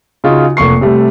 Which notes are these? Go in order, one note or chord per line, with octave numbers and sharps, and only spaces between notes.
C#3 D#4 F4 F#4
F1 A#3 C#6 C7
C3 G3 A3